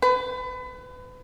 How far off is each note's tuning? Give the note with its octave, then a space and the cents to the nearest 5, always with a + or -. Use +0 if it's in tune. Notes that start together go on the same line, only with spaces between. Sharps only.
B4 +30